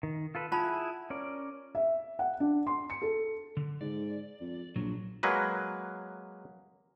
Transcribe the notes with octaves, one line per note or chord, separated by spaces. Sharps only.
D#3
F4 A4 B4
E4 F4 G#4 F#5 A5 B5
C#4 A#4 D5
E5
F#5
D4
C6
C#7
A4
D3
G#2 D5
F2
A#1 A#2 F#3
F#3 G#3 A#3 B4